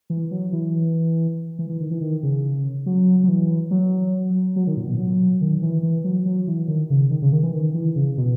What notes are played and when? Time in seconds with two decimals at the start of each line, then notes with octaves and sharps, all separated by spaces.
0.10 E3
0.31 F#3
0.52 E3
1.59 E3
1.69 E3
1.80 D#3
1.91 E3
2.01 D#3
2.23 C#3
2.86 F#3
3.24 F#3
3.28 E3
3.71 F#3
4.56 F#3
4.67 D#3
4.77 A#2
4.88 B2
4.99 F#3
5.41 D#3
5.62 E3
5.83 E3
6.04 F#3
6.26 F#3
6.47 E3
6.68 D#3
6.90 C#3
7.11 D#3
7.22 C#3
7.32 D#3
7.43 E3
7.53 D#3
7.74 E3
7.96 C#3
8.17 B2